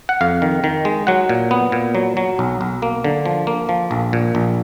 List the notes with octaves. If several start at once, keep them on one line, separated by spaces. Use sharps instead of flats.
F#5
F2 F5
D#3
D#3
G#3
F#3 F#5
A#2
B3
A#2
F#3
F#3
B1
B1
A#3
D3
F3
A#3
F3
A#1
A#2
A#1